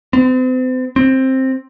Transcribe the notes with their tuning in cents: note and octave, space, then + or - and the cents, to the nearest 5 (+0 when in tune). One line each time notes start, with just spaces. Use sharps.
C4 -40
C4 +10